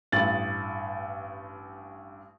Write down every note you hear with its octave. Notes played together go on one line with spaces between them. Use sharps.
A1 G2 A6 F#7